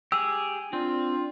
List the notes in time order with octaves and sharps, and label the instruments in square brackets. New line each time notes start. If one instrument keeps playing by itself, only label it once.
[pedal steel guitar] G4 G#4 [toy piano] E6
[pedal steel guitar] C4 [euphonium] D4 [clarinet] F4